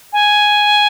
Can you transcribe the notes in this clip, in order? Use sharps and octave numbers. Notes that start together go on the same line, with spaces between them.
G#5